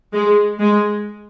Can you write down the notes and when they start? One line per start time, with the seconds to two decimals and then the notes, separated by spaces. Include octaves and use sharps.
0.14 G#3
0.60 G#3